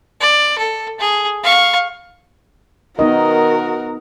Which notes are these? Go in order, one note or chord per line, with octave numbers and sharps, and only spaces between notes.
D5
A4
G#4
F5 C#6
D#3 B3 D#4 F#4 A#4 D#5